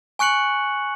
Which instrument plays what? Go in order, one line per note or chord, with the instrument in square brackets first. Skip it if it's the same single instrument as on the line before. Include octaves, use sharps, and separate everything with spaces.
[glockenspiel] G#5 C#6 F#6 C#7 F#7